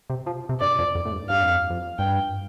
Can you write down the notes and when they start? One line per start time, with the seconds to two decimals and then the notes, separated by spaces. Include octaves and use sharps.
0.10 C3
0.26 F3
0.49 C3
0.60 G2 D5
0.79 F2
0.95 F2
1.05 A2
1.12 G2
1.29 G2 F5
1.43 F2
1.70 F2
1.98 G2 G5